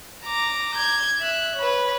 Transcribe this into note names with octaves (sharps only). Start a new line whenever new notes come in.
A#5 D6
G6 G#6
E5 F#6
B4 C#5